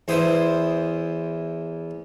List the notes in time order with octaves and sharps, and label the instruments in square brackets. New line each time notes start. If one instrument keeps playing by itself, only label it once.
[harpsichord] E2 E4 C5 D#6